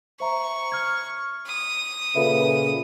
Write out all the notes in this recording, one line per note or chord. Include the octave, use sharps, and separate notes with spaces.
C5 E5 A#5 C#6
F6 G#6
D#6
A#2 C#3 A4 B4 E5